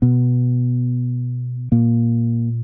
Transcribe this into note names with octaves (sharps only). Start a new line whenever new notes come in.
B2 B3
A#2 A#3